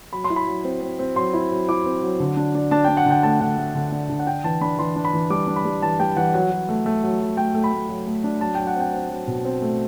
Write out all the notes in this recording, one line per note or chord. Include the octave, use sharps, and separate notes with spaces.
F#3 B5
C6
E4
B5
F#3
C4
C4
C4
F#3 C6
E4
F#3
E4 D6
C4
F#3
D3
D4
D4
D4 A5
D4 G5
F#5
D3 G5
A3 A5
D3 F#5
A3
D3
D4
D3
F#5
D4 G5
E3 A5
D4 B5
E3 C6
D4
B5
E3
G3 D6
D4
B5
G3
E3 A5
G3 G5
E3 F#5
F#3 F#5
F#3
A3
A3
F#3
F#3
A3 G5
A3
B5
A3
F#3
A3
D4
F#3 A5
F#3 G5
F#5
C4 G5
C4
F#3
B2
C4
A3